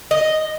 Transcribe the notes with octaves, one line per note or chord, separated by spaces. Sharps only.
D#5